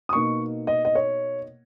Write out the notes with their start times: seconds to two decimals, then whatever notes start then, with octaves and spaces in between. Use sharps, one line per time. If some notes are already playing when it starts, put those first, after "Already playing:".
0.09 D#6
0.13 B2 A#3 D#4 C#6
0.67 D#5
0.85 D#5
0.95 C#5